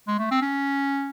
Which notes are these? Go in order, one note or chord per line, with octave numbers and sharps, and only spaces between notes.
G#3
A3
C4
C#4